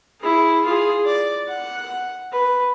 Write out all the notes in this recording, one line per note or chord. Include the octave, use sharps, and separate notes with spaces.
E4 G#4
F4 G#4
D5
F#5
B4